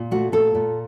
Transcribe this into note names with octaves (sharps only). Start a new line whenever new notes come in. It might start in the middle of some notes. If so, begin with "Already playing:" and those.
Already playing: A#2
A3 F#4
A#2 A4
A#2